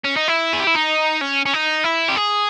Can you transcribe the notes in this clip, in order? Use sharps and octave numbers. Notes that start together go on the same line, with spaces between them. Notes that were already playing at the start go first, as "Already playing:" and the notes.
C#4
D#4
E4
G#4
G4
E4
D#4
C#4
C#4
D#4
E4
G4
G#4